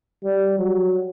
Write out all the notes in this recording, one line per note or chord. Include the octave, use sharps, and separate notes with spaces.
G3
F#3